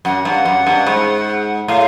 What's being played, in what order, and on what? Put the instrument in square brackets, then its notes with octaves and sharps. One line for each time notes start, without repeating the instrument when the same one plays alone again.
[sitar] F#2 [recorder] F#5
[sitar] G2
F#2
G2
G#2
[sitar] A2 [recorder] F5